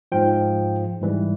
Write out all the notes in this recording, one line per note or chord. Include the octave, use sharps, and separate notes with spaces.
G#2 F3 G5
G#2 E3 G3